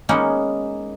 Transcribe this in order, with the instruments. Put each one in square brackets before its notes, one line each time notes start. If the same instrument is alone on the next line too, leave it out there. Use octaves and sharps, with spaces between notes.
[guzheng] G#3 A#3 B3 C#4 D#4 F#5